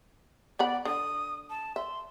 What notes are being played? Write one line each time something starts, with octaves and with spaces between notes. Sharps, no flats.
B3 D5 F#5 B5
D3 D#6
A5
E5 C6